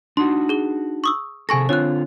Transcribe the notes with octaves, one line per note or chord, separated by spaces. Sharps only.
D4 D#4 F#4 C6
G#4 G7
C#6 D#6 E6
C3 G#4 A4 G#5 C#6 A#6
D3 C4 F4 C#5 F#6